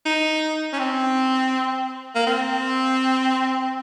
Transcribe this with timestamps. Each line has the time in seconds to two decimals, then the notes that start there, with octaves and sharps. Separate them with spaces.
0.06 D#4
0.73 C#4
0.79 C4
2.15 A#3
2.27 C4